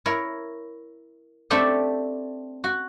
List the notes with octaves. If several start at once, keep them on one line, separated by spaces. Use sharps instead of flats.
E4 A#4 C#5
A3 C4 D4 G4 A4
F#4